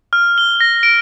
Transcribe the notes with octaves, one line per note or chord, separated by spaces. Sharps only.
F6
G7
A#6
D7